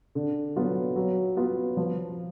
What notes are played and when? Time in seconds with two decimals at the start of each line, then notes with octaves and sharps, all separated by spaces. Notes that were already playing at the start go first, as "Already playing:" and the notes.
0.15 D3
0.56 F#3 B3 F4
0.96 F#3
1.37 B3 F4
1.77 F3